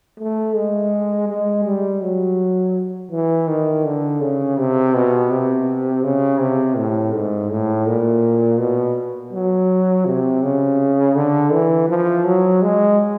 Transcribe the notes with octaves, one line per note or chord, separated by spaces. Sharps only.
A3
G#3
G#3
G3
F#3
E3
D#3
D3
C#3
C3
B2
C3
C#3
C3
A2
G#2
A2
A#2
B2
F#3
C3
C#3
D3
E3
F3
F#3
G#3